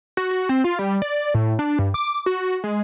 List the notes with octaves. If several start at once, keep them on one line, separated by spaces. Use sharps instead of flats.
F#4
F#4
C4
F4
G3
D5
A2
D4
G2
D6
F#4
G#3